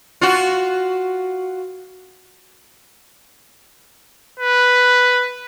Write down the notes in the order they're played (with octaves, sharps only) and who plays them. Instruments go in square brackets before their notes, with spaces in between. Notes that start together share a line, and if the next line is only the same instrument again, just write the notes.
[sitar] F4 F#4
[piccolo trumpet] B4